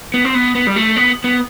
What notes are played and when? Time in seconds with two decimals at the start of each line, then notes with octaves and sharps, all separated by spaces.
0.14 B3
0.25 C4
0.34 B3
0.55 B3
0.67 G3
0.76 A3
0.96 B3
1.24 B3